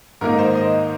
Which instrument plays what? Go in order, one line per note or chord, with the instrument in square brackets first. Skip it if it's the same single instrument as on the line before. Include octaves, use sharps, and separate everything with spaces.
[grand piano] G#2 D#3 A#3 D#4 A#4
C5
D#5